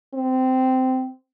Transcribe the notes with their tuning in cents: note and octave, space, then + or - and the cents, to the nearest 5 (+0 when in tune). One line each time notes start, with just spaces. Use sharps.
C4 -15